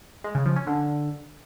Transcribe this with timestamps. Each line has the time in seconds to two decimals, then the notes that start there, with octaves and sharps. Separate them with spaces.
0.24 G#3
0.35 C#3
0.46 F3
0.56 C#4
0.67 D3